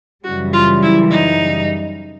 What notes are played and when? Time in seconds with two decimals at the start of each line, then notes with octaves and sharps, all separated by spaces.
0.24 F#2 C#3 E3 G3 F#4
0.53 F4
0.83 E4
1.11 D#4